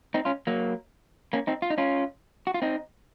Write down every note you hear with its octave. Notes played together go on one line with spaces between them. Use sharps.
C4 D#4
C#4 F4
F#3 A#3
A#3 C#4
C4 D#4
F4
D#4
C#4 F4
F#4
F4
C4 D#4